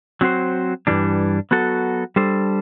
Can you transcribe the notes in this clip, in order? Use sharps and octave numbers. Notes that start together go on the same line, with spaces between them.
F#3 C4 F#4 C5
G2 E3 G3 D4
F#3 B3 F#4 A4
G3 D4 A4 C5